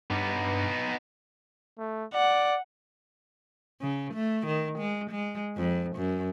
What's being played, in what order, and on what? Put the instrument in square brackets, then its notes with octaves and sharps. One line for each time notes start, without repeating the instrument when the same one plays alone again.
[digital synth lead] G2 [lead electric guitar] B3 D#4
[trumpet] A3
[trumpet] D5 [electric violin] F#5
[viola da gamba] C#3
A3
D#3
G#3
G#3
F2
F#2